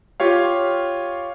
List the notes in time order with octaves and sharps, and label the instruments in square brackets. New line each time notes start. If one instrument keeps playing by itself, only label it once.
[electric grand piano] F4 G4 C#5 F5